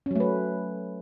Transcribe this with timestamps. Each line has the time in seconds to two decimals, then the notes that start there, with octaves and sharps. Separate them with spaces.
0.06 C#4
0.11 F#3
0.15 A3
0.20 B4